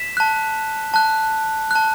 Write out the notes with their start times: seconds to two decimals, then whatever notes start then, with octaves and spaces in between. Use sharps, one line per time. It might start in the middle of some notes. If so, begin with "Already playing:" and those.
Already playing: B6 E7
0.17 A5 F#6
0.94 A5 F#6
1.71 A5 F#6